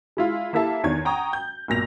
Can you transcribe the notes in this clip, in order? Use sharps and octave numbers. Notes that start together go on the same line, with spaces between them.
G#3 E4 F4
A#3 E4 G4 A4 E5 A5
E2 D#3 D4 C#5 G#6
F#5 G5 A#5 C#6 D#6
G6
F#1 B1 A#2 A#6 F7